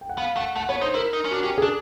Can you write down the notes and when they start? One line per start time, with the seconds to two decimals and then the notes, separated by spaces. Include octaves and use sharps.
0.01 G5
0.09 F#5
0.18 B3 F5
0.36 A3 F#5
0.56 A3 F#5
0.69 B3 C#5
0.81 D#4 C5
0.95 E4 A#4
1.13 D#4
1.25 C#4
1.31 D4 F#4
1.43 C#4 G4
1.58 D4 G#4